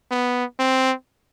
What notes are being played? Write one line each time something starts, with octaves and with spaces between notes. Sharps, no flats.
B3
C4